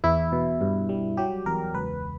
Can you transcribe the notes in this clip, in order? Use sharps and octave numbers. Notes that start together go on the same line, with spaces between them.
E2 E4
B2
G2
G3
F#3 G4
E2 A#4
C#2 B4